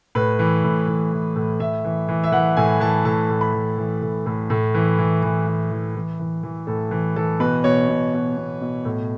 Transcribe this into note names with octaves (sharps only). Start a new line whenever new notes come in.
A2 B4
E3
A2
E3
E3
A2
A2 E5
E3
E3
E5
E3 F#5
A2 G#5
E3 A5
A2 A5
A2
B5
E3
E3
A2
A2
A2
E3
E3
E3
E3
E3
E3
E3
E3
A2 A4
E3
E3 A4
B2 B4
B2 C#5
B2
B2
B2
B2
A2